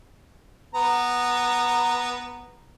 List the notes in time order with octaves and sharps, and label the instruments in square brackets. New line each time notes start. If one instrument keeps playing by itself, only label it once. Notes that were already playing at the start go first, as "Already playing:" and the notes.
[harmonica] B3 A#5